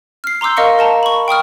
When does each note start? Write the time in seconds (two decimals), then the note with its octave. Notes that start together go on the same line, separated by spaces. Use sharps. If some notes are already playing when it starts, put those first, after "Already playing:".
0.24 F6 C7
0.41 A#5 C6 D6 E6 G6
0.57 A#4 D#5 F5 C#6 C#7
0.78 A#4 D#5 A5 A#5
1.03 B5 C#6
1.28 G5 C#6 D#6 F6